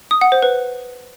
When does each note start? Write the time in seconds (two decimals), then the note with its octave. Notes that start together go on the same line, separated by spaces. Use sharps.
0.11 D#6
0.21 F#5
0.32 C5
0.42 B4